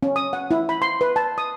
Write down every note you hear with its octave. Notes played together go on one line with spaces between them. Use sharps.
C#4
D#6
F#5
E4
B5
C6
B4
A5
D#6